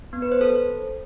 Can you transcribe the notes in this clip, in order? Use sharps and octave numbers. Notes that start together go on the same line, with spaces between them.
B3
B4
C5
A4